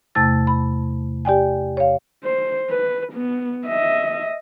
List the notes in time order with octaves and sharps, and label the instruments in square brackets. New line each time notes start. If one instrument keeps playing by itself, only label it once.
[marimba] E2 C3 A3 A5 E6 A6
B5
G4 D5 G5 G#5
C#5 F5
[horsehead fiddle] C5
B4
B3
D#5 E5